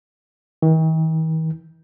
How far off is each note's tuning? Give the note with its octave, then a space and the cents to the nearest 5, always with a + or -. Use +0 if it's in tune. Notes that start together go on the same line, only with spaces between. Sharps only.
D#3 +45